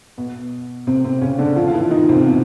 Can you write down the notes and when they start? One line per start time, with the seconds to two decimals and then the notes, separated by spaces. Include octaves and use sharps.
0.18 B2 B3
0.87 C3 C4
1.04 C3 C4
1.21 C#3 C#4
1.38 D3 D4
1.56 F3 F4
1.68 F4
1.73 E3 E4
1.91 D#3 D#4
2.09 C3 C4
2.25 B2 B3